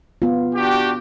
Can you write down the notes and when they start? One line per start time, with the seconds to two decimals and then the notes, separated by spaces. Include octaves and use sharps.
0.22 B3 F4
0.55 D4 F#4 G4